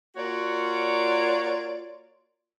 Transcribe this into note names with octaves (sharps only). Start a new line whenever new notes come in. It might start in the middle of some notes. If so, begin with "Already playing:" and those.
A#3 F4 F#4 C#5 D5